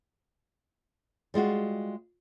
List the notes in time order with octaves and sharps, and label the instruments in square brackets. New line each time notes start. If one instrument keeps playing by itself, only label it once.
[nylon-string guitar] G3 G#3 F4 F#4